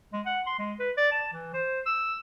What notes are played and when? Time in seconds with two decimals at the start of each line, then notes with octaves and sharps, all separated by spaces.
0.13 G#3
0.26 F#5
0.47 C6
0.59 G#3
0.80 B4
0.98 D5
1.12 A5
1.33 E3
1.54 C5
1.86 E6